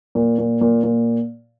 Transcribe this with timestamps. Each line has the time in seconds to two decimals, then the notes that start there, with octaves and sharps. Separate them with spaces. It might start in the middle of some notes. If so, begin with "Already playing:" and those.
0.15 A#2
0.38 A#2
0.61 A#2
0.84 A#2